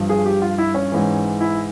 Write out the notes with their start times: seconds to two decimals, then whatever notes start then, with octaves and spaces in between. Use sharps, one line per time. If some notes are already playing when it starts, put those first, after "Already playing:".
Already playing: G2 F3
0.09 G#4
0.26 G4
0.42 F4
0.58 E4
0.74 C#4
0.92 G#2 E3
1.41 E4